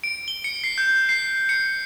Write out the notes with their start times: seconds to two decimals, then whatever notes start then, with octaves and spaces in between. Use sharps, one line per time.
0.04 D7
0.28 G7
0.44 C#7
0.64 C7
0.78 G6
1.09 C7
1.49 C#7